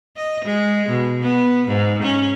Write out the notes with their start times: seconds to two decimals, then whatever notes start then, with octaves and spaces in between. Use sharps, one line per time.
0.16 D#5
0.45 G#3
0.89 B2
1.22 B3
1.68 G#2
2.03 C#4